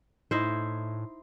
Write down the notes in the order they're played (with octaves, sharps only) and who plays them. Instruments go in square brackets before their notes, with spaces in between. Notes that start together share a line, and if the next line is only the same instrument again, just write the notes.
[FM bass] A2 [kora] D#4 E4 C5